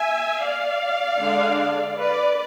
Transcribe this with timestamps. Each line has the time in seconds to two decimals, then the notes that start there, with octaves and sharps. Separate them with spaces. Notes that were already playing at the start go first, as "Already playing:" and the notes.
Already playing: E5 G#5
0.41 D5 F5
1.19 D3 G#3 D4
1.97 B4 D5